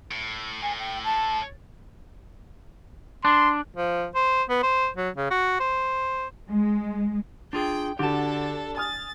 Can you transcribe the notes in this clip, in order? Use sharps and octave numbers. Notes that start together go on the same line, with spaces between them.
A2
A2 G#5
G5
A5
D4 C6
F3
C5
B3
C5
F#3
C#3
F#4
C5
G#3
D4 F4 G#4 G5
D3 D4 F#4 G4 A4 A5
G#5 D#6 F6 A6